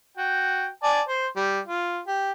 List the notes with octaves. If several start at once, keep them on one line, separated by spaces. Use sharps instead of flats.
F#4 G5
D5 G#5 A5
C5
G3
F4
G4